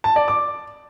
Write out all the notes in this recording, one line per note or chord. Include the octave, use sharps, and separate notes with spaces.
A5
D5
D6